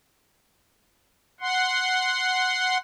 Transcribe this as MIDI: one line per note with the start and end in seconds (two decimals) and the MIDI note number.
1.41 2.78 78
1.41 2.78 84